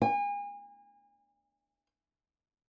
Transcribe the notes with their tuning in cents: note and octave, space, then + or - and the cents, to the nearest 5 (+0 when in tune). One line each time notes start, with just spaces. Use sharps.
G#5 -35